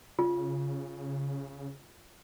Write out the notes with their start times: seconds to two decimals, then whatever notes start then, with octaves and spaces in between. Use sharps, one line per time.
0.19 C#3 F4